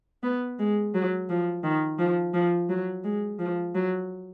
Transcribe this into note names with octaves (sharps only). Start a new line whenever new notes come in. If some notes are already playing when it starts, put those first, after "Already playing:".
B3
G#3
F#3
F3
D#3
F3
F3
F#3
G#3
F3
F#3